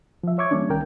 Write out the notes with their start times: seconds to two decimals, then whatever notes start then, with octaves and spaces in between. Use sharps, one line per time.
0.23 F3 E5
0.38 C#5 E5 C#6 D6 G#6
0.51 E3 G3 A#3 C#4 D4
0.69 C2 D#3 A#4 G5